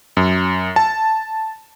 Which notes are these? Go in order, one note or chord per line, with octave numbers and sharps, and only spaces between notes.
F#2
A5